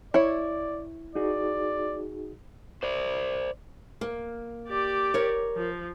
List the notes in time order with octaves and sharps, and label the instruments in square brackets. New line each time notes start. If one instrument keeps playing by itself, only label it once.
[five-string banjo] E4 C#5 [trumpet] D5
[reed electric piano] D#4 F#4 G#4 [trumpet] D5
[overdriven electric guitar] C5 D5
[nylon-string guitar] A#3
[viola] G4 D5
[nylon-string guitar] A#4 C#5
[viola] F3